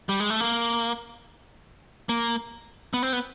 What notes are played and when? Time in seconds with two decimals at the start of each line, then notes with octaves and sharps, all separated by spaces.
0.09 G3
0.20 G#3
0.30 A3
0.40 A#3
2.09 A#3
2.94 B3
3.03 C4
3.13 B3